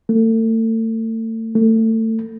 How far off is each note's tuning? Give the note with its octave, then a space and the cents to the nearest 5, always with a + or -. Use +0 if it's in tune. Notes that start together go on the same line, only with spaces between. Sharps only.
A3 +35
A3 +25